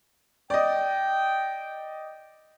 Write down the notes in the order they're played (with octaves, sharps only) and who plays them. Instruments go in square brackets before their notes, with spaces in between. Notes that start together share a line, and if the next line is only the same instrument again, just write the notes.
[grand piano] D5 D#5 [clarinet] G5